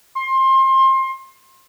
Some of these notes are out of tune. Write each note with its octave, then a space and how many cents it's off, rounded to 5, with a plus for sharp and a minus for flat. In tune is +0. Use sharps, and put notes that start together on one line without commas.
C6 +25